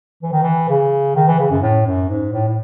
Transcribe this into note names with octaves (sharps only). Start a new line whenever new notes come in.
E3
D#3
E3
C#3
D#3
E3
C#3
F#2
A2
F#2
G#2
A2
A2